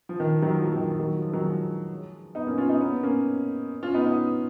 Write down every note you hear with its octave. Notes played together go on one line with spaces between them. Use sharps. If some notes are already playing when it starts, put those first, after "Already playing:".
F3
D#3
D#3 F#3
F3
F#3 A#3
D#3
D#3 F#3
F3
F3
D#3 F#3
F3 G#3
B3 D#4
A#3 C#4
C#4 F4
B3 D#4
B3 D#4
A#3 C#4
C#4 F4
B3 D#4
B3 D#4